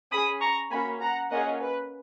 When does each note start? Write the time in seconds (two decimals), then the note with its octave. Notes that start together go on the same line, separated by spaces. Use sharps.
0.12 C#4 G#4 B5 D#6
0.41 A#5 C#6
0.71 A#3 C#4 F#4 G#5 B5
1.00 F#5 A#5
1.30 A#3 C#4 F4 G#4 D#5 F#5
1.60 B4